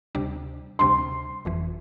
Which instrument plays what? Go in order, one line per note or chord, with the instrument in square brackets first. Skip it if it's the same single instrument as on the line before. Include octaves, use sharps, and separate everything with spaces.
[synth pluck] D2 C3 G3 D4
[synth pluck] D2 C3 G3 D4 [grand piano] C6
[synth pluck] G1 F2 E3